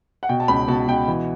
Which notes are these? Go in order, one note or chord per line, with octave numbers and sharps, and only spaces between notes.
F#5
B2 G5
A5
C#2 B5
B2 A5
B2 G5
E3